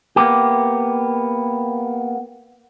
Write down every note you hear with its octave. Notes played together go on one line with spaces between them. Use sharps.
A#3 B3 G4